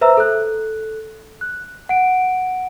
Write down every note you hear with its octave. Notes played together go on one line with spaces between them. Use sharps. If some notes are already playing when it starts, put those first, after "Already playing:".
B4 C5 E5 A#5 E6
A4 F#6
F#6
F#5 D7